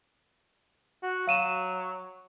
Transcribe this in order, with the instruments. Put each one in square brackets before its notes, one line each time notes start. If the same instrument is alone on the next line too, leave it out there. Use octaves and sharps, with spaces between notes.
[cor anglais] F#4
[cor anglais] F#3 [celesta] F5 D#7 E7